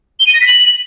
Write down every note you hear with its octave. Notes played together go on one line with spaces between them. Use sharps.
G7
D#7
A#6
B6
F#7